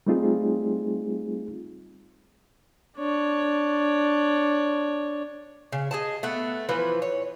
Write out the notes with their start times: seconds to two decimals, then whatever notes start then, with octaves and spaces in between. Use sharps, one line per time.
0.07 G3 A3 C4 D#4 F4 G#4
2.97 D4 C#5
5.72 C#3
5.91 G#4 D#5 A5
6.23 A3 B3 F#5
6.69 E3 F3 B4
7.02 C#5